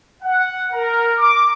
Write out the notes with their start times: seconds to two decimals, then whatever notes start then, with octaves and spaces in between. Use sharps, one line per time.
0.23 F#5
0.72 A#4
1.18 D6